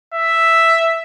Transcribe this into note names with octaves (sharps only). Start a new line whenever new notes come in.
E5